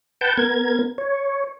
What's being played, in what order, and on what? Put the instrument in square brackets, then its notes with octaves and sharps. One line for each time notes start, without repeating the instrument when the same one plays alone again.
[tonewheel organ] B4 F#5 G5 A5 G6
B3 A#4 G#6
C#5